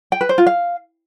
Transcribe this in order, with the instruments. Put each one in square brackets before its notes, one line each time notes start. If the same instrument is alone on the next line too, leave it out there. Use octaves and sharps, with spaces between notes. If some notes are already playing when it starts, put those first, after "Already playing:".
[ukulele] G5
B4
C5
F4
F5